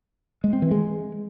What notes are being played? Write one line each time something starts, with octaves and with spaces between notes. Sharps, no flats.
G#3
C4
E3
G#3